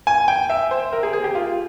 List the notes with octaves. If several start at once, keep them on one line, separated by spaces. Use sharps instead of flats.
G#5
G5
E5
C5
A#4
G#4
G#4
G4
F4